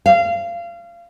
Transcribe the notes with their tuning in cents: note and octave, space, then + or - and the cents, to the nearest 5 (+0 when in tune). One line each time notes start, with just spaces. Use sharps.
F5 -25